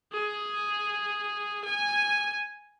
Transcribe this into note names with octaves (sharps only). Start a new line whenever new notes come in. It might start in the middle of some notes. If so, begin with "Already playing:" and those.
G#4
G#5